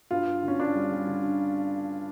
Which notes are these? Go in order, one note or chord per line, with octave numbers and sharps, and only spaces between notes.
G2 F4
G2
D3
C#4
G2 D4
G3
G3
D3
D3